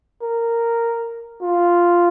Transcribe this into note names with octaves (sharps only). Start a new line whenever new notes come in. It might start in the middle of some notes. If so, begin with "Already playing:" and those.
A#4
F4